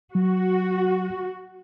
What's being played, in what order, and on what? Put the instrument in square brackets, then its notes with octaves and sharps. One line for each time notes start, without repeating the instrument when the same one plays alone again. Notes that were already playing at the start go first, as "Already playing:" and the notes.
[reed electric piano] F#3 [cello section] F#4